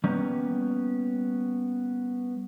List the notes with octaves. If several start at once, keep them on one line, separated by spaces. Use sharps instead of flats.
G3 A#3 B3 C#4